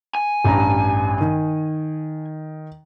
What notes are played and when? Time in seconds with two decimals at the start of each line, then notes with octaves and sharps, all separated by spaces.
0.15 G#5
0.45 A1 G2 A#5
1.21 D#3